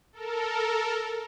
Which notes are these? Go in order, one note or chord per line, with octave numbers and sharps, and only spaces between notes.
A4 A#4